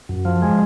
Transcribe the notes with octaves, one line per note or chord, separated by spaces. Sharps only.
F#2
F3
G#3